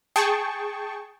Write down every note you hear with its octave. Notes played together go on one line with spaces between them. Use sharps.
G#4 G5 A5 C#6